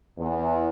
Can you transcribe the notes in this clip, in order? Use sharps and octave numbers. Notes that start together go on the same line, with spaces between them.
E2